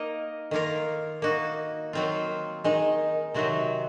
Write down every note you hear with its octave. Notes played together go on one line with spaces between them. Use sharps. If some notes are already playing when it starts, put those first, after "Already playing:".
Already playing: A#3 D#4 A#4 D#5
D#3 A#3 F4 A#4
A#3 D#4 F#4
D#3 F#3 C4 F4
D#3 G#3 D#4
C3 D#3 F#3 C4 F#4